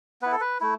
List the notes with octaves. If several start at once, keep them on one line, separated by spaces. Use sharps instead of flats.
B3 E4 B4
A4
B4
A3 E4